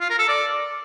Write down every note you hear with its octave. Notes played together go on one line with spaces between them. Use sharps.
F4
A#4
A4
D5